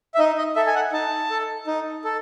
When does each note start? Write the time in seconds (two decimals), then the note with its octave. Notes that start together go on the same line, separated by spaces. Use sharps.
0.15 E5
0.19 D#4 D#5
0.38 D#5
0.56 A4 E5
0.67 G#5
0.75 F#5
0.93 D#4 A5
1.30 A4
1.67 D#4
2.04 A4